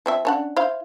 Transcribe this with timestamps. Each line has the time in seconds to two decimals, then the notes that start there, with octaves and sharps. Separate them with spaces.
0.06 F3 C4 E5
0.25 C#4 D4 F#5
0.57 E4 C5 F5